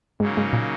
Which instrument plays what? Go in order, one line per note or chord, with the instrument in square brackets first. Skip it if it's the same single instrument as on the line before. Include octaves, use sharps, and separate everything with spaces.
[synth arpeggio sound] G#2 [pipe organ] C#3 F#3 A#3 D#4
[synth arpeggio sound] G#2
A#2